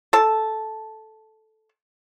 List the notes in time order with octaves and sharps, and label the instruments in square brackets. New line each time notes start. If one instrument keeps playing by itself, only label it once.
[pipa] A4 A5